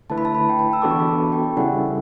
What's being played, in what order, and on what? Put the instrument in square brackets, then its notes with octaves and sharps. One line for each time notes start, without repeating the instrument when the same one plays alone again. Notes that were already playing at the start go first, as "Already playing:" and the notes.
[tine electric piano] D3 A3 E4 B4 [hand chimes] A5
[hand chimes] B5
A5
B5
G5
A5
E6
[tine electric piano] E3 B3 D4 F#4 A4 [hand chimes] D6
[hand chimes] C#6
B5
A5
G5
[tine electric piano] C#3 G3 C#4 E4 A4 [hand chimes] F#5